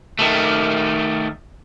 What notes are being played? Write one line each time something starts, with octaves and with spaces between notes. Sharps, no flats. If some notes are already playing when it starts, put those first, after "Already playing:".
D#3 A3